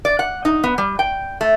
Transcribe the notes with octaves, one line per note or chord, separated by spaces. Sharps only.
D5
F#5
D#4
B3
G3
G5
A3